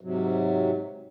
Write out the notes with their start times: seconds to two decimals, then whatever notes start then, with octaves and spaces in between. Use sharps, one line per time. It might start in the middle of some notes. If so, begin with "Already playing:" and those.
0.01 G#2 C3 F#3